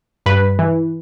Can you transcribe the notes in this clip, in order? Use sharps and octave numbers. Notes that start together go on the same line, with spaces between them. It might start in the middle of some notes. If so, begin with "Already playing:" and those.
G2 B4
E3